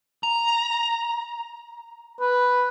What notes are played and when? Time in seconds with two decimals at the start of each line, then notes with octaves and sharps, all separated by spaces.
0.23 A#5
2.20 B4